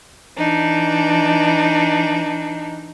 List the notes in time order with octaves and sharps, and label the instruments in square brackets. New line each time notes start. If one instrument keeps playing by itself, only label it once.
[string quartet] E3 D4 D#4